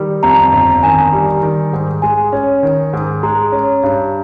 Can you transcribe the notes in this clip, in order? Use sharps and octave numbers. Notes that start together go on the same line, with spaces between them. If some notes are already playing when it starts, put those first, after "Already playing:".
Already playing: D#3 G3
F2 A#5
G1
D#3 G#5
G3
D#3
G#2
G#3 G#5
C#4
D#3
G#2
G#3 A#5
C#4
G2